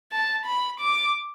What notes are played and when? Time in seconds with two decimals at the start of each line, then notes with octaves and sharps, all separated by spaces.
0.13 A5
0.46 B5
0.80 D6